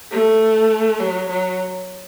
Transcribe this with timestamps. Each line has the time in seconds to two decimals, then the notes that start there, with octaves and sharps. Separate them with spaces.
0.11 A3
1.00 F#3
1.29 F#3